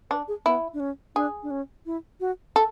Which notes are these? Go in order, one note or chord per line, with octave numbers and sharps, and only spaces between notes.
D4 B4
G#4
B3 E4
D4
C#4
D4 G#4
D4
C#4
E4
F#4
A4